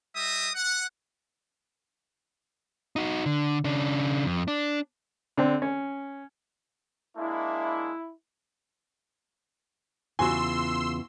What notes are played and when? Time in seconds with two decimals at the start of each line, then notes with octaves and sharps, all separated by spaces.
0.16 G3 D#5 E5 D#6
0.55 F#5
2.96 D#4 F#4
3.26 D3
3.65 C#3 D4
4.25 F2
4.48 D4
5.37 D3 C4 D4
5.62 C#4
7.17 G#3 A#3 D4 E4
10.19 E2 C#3 F4 F#4 G#5 C6 E6